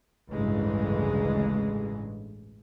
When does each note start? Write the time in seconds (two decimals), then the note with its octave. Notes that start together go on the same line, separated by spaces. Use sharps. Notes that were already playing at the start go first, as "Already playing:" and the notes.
0.30 A1 D2 G2 C#3 E3 G#3